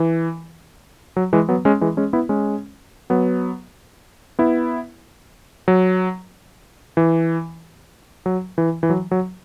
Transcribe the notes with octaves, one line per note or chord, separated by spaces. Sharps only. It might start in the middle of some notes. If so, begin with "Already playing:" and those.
Already playing: E3
F#3
E3 G#3
F#3 B3
G#3 C#4
E3 G#3
G#3 C#4
B3 E4
G#3 C#4
F#3 B3
B3 E4
F#3
E3
F#3
E3
E3
F#3
F#3